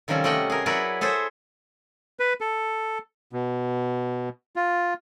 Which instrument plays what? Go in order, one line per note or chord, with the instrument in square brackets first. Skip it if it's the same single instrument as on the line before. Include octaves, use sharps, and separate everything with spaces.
[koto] C3 D#3 F3 G3 C#4 A4
G3 A3 G4 D#5 F#5 G5
G#4 A#4
F#3 E4 A#4 B4 C#5 D5
G#4 A4 C5 C#5 E5
[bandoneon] B4
A4
B2
F4